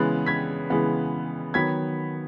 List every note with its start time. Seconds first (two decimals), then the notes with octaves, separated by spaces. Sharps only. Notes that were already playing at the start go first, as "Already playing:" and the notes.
Already playing: C#3 E3 G#3 B3 F#6 A6
0.26 G#6 B6
0.70 C#3 E3 G#3 B3
1.54 D#3 F#3 B3 G#6 B6